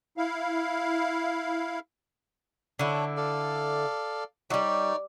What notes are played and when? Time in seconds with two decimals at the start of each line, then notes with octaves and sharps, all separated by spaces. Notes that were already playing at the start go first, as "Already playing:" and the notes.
0.17 E4 F5
2.79 D3 D4 E4 A4 C#5
3.17 A4 D5 F5
4.50 F#3 G3 D#4 C#5 D5